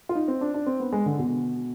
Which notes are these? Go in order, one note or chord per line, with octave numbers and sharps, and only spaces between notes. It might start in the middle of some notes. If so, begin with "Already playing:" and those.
F4
D#4
C4
D4
D4
C4
B3
G#3
D3
B2